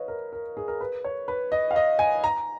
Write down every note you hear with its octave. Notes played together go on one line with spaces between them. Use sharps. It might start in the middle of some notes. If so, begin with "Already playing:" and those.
Already playing: B4 C#5 D#5 F5
A#4
A#4
G#4
A#4
B4
C#5
B4
D#5
F5
D#5
G#5
A#5